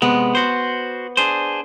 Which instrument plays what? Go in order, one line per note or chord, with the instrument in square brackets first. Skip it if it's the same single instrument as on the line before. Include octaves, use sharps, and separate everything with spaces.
[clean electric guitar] C3 G#3 [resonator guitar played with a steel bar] B3
[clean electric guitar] F#4 C5
D4 G#4 C5